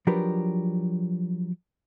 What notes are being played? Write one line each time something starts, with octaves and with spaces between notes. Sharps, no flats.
F3 F#3 D4 G4 A#4 B4